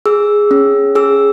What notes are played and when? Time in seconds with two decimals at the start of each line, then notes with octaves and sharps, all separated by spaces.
0.06 G#4 E6
0.51 C#4
0.95 G#4 E6